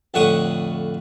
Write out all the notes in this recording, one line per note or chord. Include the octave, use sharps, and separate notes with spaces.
F2 A2 D3 F#5 C#6 D#6